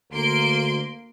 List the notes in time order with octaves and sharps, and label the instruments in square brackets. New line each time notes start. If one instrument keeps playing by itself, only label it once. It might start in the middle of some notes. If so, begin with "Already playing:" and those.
[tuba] D2 [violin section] A#3 C6 D7